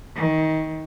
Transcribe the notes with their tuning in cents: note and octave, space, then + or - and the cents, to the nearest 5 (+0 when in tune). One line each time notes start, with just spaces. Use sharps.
D#3 +20